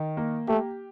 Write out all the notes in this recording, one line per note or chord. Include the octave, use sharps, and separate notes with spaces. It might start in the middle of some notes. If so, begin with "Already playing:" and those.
Already playing: D#3
A#3
A3 G4